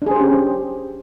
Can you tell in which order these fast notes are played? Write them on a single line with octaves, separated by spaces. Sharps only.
D4 G#4 C5 G4 C#4